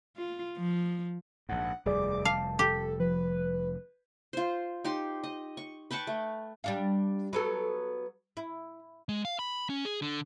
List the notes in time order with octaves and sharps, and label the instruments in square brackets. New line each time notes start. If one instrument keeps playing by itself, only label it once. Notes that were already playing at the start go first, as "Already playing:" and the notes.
[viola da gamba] F4
F3
[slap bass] A#1 G#2 [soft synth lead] F#5
[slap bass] F1 G3 [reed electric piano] D#2 G#4 D5 [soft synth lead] D6
[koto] F5 [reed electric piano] A5
[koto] G4 [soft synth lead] A4
[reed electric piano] F3 [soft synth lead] B4
[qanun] F4 C5
D#4 G4 C6
D#5
C#6
B4 G5 A5 C#6
A3
[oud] G3 D4 F5
F#3 B3 A4
E4
[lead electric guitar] G#3
F5
B5
C#4
G#4
D3